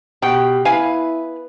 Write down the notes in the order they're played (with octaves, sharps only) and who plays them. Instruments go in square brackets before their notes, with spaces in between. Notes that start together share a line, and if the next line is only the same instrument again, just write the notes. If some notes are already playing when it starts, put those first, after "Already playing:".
[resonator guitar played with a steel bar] B2 G5 [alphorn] G4 [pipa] F#5
[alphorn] E4 [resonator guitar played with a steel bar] B4 [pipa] F5 G#5